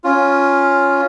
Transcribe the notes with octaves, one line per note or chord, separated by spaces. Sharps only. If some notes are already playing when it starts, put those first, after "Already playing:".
C#4 F4